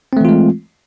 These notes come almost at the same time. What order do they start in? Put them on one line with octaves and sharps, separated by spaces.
C4 A3 E3 F4 G#3